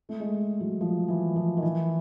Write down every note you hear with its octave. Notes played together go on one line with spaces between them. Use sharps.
A3
G#3
F#3
F3
E3
F3
D#3
E3